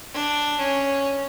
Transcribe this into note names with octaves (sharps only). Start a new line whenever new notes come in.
D4
C#4